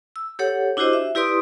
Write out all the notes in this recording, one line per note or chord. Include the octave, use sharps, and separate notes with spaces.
E6
G4 A4 C#5 F#5
D4 E4 F#4 G4 C5 D#5
E5
E4 G4 B4 D5 C6 D#6